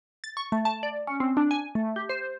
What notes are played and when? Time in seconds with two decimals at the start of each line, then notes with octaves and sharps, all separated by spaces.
0.24 A6
0.37 C#6
0.52 A3
0.65 A5
0.83 D5
1.07 C#4
1.20 C4
1.37 D4
1.51 G#5
1.75 A3
1.96 G4
2.09 C5